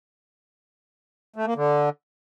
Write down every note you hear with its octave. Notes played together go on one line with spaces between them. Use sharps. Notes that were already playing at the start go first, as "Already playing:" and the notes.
A3
A#3
D3